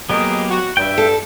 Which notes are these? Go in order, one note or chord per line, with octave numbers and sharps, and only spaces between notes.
F#3 A#3 B3 G4 G#4 D#5
F#4
G2 E5 G5
A4